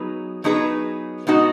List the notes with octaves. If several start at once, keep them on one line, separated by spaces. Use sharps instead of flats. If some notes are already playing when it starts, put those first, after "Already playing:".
Already playing: F#3 B3 D#4 G#4 B4
F#3 B3 D#4 G#4 B4
B2 G#3 B3 D#4 F#4